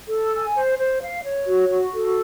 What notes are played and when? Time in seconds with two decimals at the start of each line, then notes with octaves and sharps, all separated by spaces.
0.08 A4
0.32 G#5
0.56 C5
0.78 C5
1.01 F5
1.23 C#5
1.46 F#4
1.70 F#4
1.93 A4